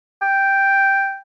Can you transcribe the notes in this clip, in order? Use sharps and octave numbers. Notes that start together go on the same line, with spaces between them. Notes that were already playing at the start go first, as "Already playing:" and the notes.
G5